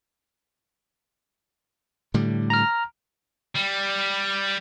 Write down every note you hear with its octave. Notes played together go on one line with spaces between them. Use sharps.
A2 D3 G3
A#5 F6
G3